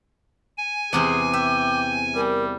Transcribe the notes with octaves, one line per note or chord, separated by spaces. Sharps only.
G#5
E2 C3 G#4 C5 D6
E5 G5
G3 A#4